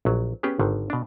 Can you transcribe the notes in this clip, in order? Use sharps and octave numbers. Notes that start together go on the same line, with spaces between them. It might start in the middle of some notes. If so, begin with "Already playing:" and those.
A#1 F#3
B3 C#4 G4 G#4 B4
G#1 D3 D#3
B2 D4